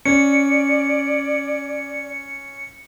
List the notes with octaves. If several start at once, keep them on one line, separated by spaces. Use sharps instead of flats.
C#4 D5 C#7